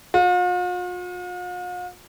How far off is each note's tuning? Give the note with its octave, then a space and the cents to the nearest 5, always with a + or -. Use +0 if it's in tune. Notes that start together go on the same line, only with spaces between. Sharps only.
F4 +45